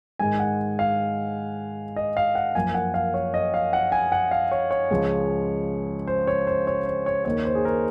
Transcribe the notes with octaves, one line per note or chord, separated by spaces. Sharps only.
G#2 D#3 G#3 G#5
F#5
F5
D#5
F5
F#5
F#2 F3 A#3 G#5
F#5
F5
C#5
D#5
F5
F#5
G#5
F#5
F5
C#5
C#5
C#2 C#3 F3 G#3
C5
C#5
C5
C#5
C5
C#5
D#2 D#3 A#3 C#5
C5
G#4
A#4